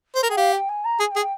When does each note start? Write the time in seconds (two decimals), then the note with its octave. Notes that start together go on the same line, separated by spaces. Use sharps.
0.15 C5
0.23 A#4
0.30 G#4 G5
0.37 G4 F5
0.53 G5
0.69 G#5
0.85 A#5
1.00 G#4 G#5
1.11 G5
1.16 G#4
1.21 G5